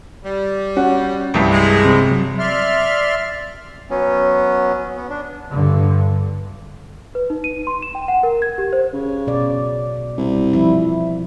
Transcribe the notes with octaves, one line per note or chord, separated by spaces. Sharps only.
G3
C#4 F#4
C2 G2
G#3
C3 C4
F#3
D5 E5 C6 F6
F#3 B3 C#4
B3
D4
G2 D3
B4
D#4
D#7
C6
E7
G5
F#5
A#4
G#6
G4
C5
C#3
B2 D5
C2
F3 E4